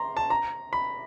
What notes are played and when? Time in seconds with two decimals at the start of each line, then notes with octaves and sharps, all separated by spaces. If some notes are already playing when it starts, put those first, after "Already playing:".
Already playing: A#5 C6
0.17 A5
0.30 A#5
0.73 B5